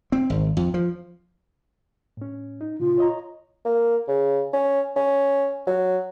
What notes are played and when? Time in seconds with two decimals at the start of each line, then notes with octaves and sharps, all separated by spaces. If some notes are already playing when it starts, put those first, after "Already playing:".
0.12 C4
0.30 G#1
0.57 F2
0.74 F3
2.17 A2 C#4
2.61 D#4
2.80 A#2 C#3 F4
2.98 C#5 D#5 A#5
3.65 A#3
4.08 C#3
4.53 C#4
4.96 C#4
5.67 F#3